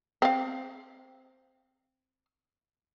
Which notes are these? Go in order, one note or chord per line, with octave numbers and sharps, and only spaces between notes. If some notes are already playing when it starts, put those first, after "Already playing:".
C4 F5